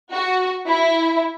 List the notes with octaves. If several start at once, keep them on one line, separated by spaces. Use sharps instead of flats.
F#4
E4